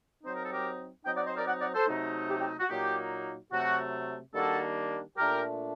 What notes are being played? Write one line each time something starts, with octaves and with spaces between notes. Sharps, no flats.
F#3 C4 D#4 C5
A#4
A4
G4 A#4
F#3 C4 D#4 D#5 G5
D5 F#5
C5 D#5
A#4 D5
D5 F#5
D5 F#5
A4 C5
C3 F#3 A3 D#4
G4
G4
F#4
A#2 F#3 A#3 D#4 G4
C3 F#3 A3 F#4
D#3 G3 A#3 D4 F#4 A4
A#2 A3 D4 G4 A#4